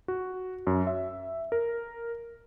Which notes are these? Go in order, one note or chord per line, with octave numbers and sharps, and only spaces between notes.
F#4
F#2
E5
A#4